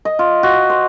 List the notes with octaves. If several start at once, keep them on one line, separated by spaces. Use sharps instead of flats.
D#5
F4
F#4
C5